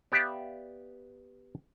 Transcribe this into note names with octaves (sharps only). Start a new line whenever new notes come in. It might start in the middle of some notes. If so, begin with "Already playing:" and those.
B3 G4 D5 E5 F5